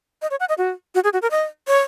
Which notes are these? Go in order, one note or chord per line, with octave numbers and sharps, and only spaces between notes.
D#5
C#5
F#5
D#5
F#4
F#4
G#4
F#4
A#4
D#5
C#5